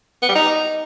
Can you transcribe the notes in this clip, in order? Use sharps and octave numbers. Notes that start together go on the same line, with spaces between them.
B3
G3
D#4